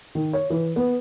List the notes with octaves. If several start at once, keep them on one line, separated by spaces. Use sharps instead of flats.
D#3
C#5
E3
B3